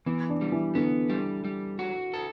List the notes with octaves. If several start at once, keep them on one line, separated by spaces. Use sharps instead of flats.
E3 B3
D4
G3
E3
D3 B3
G3
G3
F#4
A4